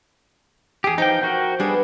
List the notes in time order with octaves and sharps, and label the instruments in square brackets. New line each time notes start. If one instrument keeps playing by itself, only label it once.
[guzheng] E2 A5 [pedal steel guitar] G4 G#4
[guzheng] F3 [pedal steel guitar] D#4 G5
[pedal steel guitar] F#4 A#4 G5
[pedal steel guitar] G3 D4 G#4 [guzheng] B3